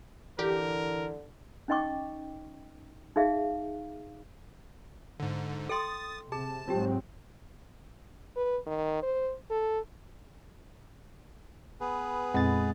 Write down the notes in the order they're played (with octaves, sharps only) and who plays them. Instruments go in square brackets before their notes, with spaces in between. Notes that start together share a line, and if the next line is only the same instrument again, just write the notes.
[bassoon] D3 [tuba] E3 [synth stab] G4 [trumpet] A#4
[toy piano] C#4 D#4 D#5 G5 C#6 D6
D#4 G#4 E5 F5
[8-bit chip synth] G#2 D3
[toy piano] A4 G5 C6 [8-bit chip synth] D#6 A6
[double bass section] C3 [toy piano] G#4 [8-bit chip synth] A5
[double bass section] G#2 F#3 C4 [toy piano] F4 G4
[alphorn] B4
D#3
C5
A4
[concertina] B3 G#4 B4
[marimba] F2 A#2 C4 [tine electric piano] G#3 A6